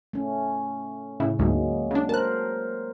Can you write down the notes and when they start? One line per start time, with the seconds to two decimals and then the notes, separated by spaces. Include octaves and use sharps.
0.13 A3 C#4
1.20 A2 C#3 E4
1.39 D2 G#2 F#3 G#3 A#3
1.91 C#3 D4
2.09 A#4 C5 A5 F#6